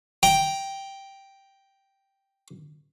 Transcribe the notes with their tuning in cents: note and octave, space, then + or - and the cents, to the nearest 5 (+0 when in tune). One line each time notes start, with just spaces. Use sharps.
G5 +0 A#5 +20